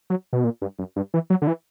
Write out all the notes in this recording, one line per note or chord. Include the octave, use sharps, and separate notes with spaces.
F#3
B2
A#2
G2
F#2
G2
E3
F#3
D3
E3